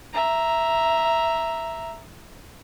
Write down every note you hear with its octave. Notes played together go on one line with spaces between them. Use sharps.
E5 A#5